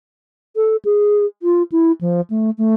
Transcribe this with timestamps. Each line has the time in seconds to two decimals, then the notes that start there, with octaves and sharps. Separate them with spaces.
0.56 A4
0.85 G#4
1.43 F4
1.72 E4
2.01 F3
2.30 A3
2.58 A3